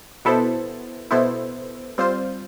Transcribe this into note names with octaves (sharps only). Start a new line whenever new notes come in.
B2 B3 E4 A4 C5
B2 B3 E4 A4 C5
G3 C4 F4 C5